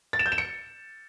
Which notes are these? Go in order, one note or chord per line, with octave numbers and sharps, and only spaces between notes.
A6
E7
G6
E7
C#7